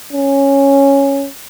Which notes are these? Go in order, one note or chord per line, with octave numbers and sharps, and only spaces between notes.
C#4